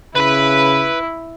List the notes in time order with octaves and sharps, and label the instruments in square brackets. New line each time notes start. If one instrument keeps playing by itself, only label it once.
[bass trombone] C#3 [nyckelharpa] E4 [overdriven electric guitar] B4 B5